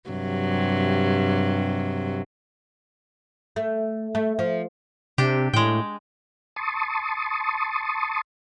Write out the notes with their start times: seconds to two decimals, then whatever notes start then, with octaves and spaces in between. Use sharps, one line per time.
0.10 G2 C3 F#3
3.56 A3
4.15 A3
4.39 F3
5.18 C3 D4 G4
5.53 A2 G#3 G5
6.56 A5 C6 C#6 D#6